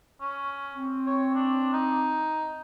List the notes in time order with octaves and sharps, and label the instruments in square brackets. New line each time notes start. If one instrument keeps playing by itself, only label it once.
[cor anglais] C#4
[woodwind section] C4
[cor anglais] C#5
D4
D#4